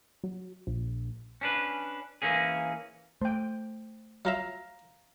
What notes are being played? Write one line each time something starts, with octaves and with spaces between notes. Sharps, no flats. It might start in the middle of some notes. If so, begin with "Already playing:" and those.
F#3
A#1
C#4 D4 B4
E3 A#3 C#4 G#4
A3 C5 G5
F#3 F4 E5 F5 A#5